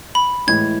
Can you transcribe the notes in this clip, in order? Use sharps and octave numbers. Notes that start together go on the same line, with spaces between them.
B5
A2 E3 G#3 G#6